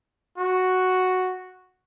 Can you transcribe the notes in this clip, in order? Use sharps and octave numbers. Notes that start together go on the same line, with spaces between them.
F#4